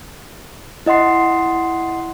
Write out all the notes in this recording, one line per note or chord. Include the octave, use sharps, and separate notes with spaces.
E4 D#5 F#5 C6 C7